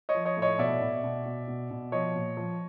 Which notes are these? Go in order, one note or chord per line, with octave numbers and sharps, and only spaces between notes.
C#5 D#5
F3
C#5 D#5
A2
C#5 D#5
B2 D5 E5
B2
B2
B2
B2
B2
F3 C#5 D#5
A#2
F3